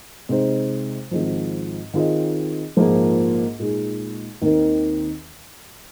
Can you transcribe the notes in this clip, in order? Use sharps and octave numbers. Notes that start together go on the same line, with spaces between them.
C3 G#3 D#4 C5
G#1 G#2 F3
D#3 C4 F4 G#4 D#5
A#1 G#2 F3 A#3 G#4
A#2 G#3 D#4 G#4
D#2 D#3 C4 D#4 A#4